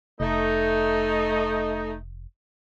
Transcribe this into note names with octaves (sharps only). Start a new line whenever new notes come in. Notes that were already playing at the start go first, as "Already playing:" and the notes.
F1 A3 D#4